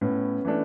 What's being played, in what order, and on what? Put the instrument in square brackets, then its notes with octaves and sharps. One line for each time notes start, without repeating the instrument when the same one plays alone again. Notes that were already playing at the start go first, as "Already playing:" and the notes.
[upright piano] A2 [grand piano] B3 C#4
[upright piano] E3 A3 D4